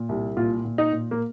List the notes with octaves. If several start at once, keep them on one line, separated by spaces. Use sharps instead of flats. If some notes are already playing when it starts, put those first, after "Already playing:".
Already playing: A#2
C2
A#2 F4
A#2
D#4
A#2
A#3